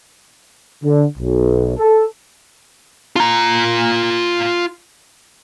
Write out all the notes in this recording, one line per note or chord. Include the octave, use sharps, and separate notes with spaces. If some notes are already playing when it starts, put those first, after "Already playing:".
D3
B1
A4
F4 A#5